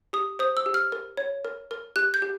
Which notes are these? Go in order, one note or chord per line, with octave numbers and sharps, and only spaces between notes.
G4 D#6
C5 D#6
E6
G4
F6
A#4
C#5
A#4
A#4
G4 F#6
G6
G4